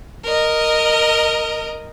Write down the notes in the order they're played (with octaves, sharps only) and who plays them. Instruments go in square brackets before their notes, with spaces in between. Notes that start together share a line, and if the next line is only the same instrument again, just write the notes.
[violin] A#4 D#5